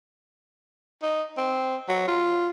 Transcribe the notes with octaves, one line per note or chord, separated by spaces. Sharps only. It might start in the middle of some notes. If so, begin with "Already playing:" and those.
D#4
C4
F#3
F4